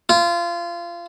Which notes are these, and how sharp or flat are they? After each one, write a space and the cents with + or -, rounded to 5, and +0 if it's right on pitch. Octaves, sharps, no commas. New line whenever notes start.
F4 -25